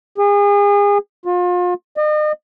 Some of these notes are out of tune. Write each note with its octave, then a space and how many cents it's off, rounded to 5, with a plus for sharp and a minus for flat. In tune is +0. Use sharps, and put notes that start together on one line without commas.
G#4 -35
F4 +35
D#5 -40